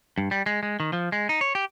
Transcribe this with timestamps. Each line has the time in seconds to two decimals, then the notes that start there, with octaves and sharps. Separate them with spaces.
0.18 G2
0.31 G3
0.46 G#3
0.63 G#3
0.80 D#3
0.93 F3
1.12 G#3
1.29 D#4
1.41 C#5
1.55 G4